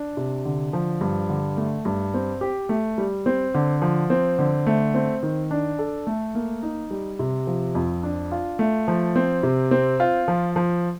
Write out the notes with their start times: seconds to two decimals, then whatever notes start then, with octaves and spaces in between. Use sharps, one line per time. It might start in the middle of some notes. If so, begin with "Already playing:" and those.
Already playing: D4
0.17 C3
0.45 D3
0.73 F3
1.01 G2
1.29 D3
1.57 A3
1.85 G2
2.14 C4
2.41 G4
2.69 A3
2.98 G3
3.26 C4
3.54 D3
3.82 F3
4.10 C4
4.39 D3
4.67 A3
4.94 C4
5.23 D#3
5.51 D4
5.79 A4
6.07 A3
6.35 A#3
6.63 D#4
6.91 G3
7.19 C3
7.47 F3
7.75 F2
8.03 D4
8.32 F4
8.59 A3
8.88 F3
9.16 C4
9.43 C3
9.71 C4
10.00 F4
10.28 F3
10.56 F3